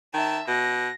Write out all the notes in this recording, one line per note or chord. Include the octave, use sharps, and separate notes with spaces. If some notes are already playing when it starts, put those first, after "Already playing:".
D#3 E5 A5
B2 A#6